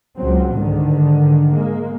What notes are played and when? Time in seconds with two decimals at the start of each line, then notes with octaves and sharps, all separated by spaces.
0.17 C#2 F#3 C4
0.51 G#2 D3 D#3
1.51 G#3 A#3